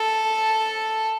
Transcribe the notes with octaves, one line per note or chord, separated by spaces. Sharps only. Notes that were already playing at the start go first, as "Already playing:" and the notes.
Already playing: A4